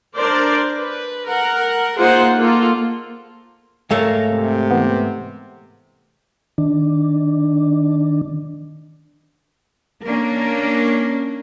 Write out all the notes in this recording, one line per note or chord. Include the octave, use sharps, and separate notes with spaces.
D4 A#4 C5 D5
B4
A#4 F#5
A#3 D#4 F4 G#4 C5 F#5
A#3 F4 A4
G#2 A3 A#4 C#5 F5
C3
E3 B3
D#3 D4
A#3 C#4 D4 A#4